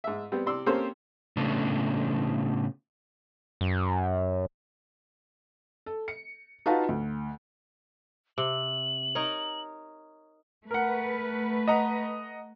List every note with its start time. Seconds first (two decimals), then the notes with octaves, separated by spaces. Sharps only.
0.04 G#2 E5
0.32 G3 B3 C4
0.46 C3 D5 C6 E6
0.66 A#3 C4 C#4 G4 A4 C5
1.37 A2 C#3 A3 B3 C#4 D4
3.61 F#2
5.86 A4
6.08 C#7
6.66 D#4 F4 F#4 B4 F5 A5
6.89 D2
8.38 C3 F#7
9.15 D#4 A#4 C#5
10.71 A3 A#4 B4 F#5
11.68 D#5 F#5 A#5